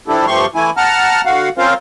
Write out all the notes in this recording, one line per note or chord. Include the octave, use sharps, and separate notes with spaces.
E3 F3 D4 E4 G4 A4
G2 F3 A3 G4 C6 C#6
E3 A3 E4 G#5
F#5 A5 A#5 F6
D3 F#4 F5 F#5
C4 C#4 F4 A#4 C5 F5